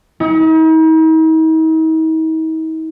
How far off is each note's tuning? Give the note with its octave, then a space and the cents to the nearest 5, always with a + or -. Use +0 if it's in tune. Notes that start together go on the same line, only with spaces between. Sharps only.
D#4 +45